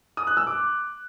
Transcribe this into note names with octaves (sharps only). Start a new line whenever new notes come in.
D#6
F#6
E6
D6